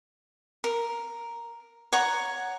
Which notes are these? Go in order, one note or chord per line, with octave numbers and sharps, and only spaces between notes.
A#4
C#5 F#5 A#5 C#6